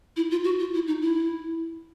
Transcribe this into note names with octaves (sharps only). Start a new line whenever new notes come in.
E4
F4
F#4
F4
E4
D#4
E4